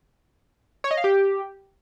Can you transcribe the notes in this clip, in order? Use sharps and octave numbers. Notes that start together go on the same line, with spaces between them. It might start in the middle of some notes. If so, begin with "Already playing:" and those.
C#5
D#5
F5
G4